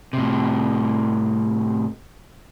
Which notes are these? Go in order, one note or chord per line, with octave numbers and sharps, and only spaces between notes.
A2 C3